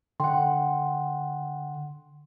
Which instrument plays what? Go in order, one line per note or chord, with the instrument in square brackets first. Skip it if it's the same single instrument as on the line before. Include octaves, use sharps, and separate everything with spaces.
[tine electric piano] D3 F#5 [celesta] G5 C6